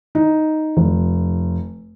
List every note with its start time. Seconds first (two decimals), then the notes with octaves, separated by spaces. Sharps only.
0.15 D#4
0.77 F1